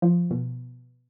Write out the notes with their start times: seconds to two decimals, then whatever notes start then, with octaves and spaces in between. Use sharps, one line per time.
0.02 F3
0.31 B2